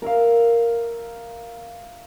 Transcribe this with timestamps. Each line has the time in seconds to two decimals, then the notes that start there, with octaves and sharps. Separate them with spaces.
0.02 A#4 E5 F5